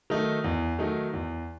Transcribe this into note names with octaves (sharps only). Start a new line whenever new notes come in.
D#3 F#3 A3 D#4
E2
D#3 F#3 A3 D#4
E2